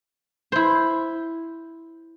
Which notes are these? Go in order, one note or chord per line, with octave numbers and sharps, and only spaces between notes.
E4 C5